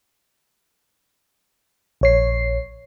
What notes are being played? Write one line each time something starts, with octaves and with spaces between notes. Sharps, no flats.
A#1 C#5 C7